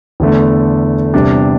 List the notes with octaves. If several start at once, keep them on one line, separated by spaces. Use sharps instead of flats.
E2 D3 A3 D4
E2 C3 G3 D4 G4